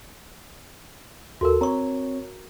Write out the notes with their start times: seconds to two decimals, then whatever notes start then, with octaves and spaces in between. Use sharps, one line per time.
1.41 D#2 F#4 A4 A#4
1.61 C4 C#5 A#5 C#6